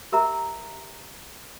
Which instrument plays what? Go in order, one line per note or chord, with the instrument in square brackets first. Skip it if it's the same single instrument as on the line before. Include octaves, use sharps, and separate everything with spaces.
[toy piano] G4 A#4 E5 A#5